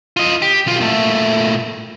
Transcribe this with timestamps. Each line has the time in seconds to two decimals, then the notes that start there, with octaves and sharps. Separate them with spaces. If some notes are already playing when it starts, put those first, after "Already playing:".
0.17 F4 D#5
0.42 G4
0.67 B1 F4
0.80 A#2 A3